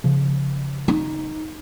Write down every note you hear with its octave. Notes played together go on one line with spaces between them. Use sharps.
C#3 F3
D#4